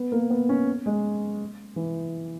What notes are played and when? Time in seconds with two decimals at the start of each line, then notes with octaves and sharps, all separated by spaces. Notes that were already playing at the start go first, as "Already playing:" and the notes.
Already playing: B3
0.12 A#3
0.30 B3
0.49 C#4
0.86 G#3
1.76 E3